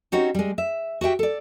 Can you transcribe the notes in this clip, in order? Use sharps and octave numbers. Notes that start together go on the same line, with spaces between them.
C4 C#4 D#4 F#4 G4 C#5
G3 G#3
E5
F#4 G4 E5 G5
A4 D5